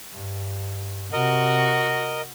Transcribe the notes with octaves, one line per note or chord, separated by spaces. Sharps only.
G2
C3 F#4 A#4 D#5